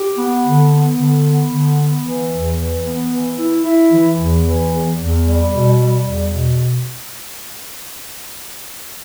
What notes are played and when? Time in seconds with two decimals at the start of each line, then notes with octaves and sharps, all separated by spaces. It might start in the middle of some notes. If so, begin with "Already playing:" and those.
Already playing: G4
0.17 B3
0.44 D3
0.71 B3
0.98 D3
1.25 B3
1.51 D3
1.77 B3
2.05 E3
2.31 E2
2.57 E3
2.84 B3
3.10 E3
3.37 E4
3.64 E4
3.91 E3
4.17 E2
4.43 E3
4.70 E2
4.97 E2
5.24 G3
5.50 B2
5.77 G3
6.04 E2
6.30 B2